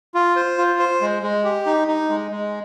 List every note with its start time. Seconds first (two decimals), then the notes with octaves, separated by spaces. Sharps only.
0.14 F4
0.36 C5
0.58 F4
0.79 C5
1.01 G#3
1.23 G#3
1.44 G4
1.66 D#4
1.88 D#4
2.09 G#3
2.31 G#3